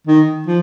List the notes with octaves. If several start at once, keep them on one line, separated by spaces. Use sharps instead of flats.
D#3
F3